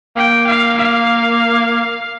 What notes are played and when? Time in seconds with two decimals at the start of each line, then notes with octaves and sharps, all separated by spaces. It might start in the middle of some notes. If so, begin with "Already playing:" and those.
0.16 A#3 G5
0.47 F5
0.78 F5